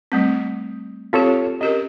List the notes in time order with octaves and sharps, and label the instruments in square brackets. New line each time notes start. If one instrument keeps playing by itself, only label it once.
[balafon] G3 A3 C4
[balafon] C4 G4 [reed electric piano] F4 A4 C#5
[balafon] C#4 G4 A#4 [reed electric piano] D#5